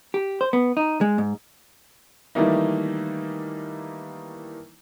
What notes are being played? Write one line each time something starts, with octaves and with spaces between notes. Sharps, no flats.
G4
C5
B3
D#4
G#3
G#2
D#3 E3 G3 A3 A#3 D#4